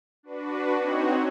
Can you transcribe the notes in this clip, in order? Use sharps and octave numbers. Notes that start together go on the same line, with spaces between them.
D4 F#4 B4
C4 D#4 F#4 C#5 D#5